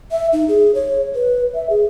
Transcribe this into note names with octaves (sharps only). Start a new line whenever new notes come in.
E5
D#4
G#4
C#5
B4
E5
G#4